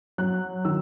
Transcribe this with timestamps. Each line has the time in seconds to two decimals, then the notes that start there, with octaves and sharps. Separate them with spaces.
0.18 F#3 F#6
0.65 D#3 E6